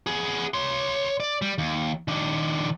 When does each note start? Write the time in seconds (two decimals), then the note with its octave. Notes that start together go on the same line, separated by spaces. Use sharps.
0.07 B3 G#4
0.54 C#5 C6
1.20 D5
1.42 G3
1.58 D#2
2.08 D#3 D4